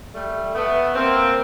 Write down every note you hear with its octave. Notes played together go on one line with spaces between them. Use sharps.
G3 A3
A3 B3
A#3 C4